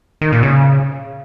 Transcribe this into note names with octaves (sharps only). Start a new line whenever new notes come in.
D#3
A#2
C#3